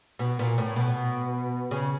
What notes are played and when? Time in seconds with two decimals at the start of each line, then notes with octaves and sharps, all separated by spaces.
0.19 B2
0.39 A#2
0.58 A2
0.76 B2
1.71 C#3